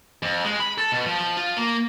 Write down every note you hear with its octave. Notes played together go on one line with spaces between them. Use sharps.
F2
G#3
B5
A4
B2
F3
F4
A#3